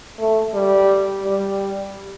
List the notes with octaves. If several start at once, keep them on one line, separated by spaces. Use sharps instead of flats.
A3
G3
G3